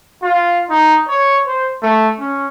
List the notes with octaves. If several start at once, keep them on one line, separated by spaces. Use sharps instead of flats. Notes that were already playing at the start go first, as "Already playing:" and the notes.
F4
D#4
C#5
C5
A3
C#4